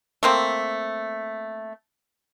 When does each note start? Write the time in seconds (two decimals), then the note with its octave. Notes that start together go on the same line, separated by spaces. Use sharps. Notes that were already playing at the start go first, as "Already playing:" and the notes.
0.23 A3 A#3 C4